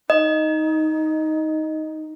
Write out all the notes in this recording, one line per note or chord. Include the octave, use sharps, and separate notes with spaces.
D#4 D#5